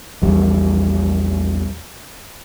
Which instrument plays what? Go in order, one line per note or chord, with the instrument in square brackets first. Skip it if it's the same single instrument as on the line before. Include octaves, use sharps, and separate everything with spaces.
[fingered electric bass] A#1 E2 G3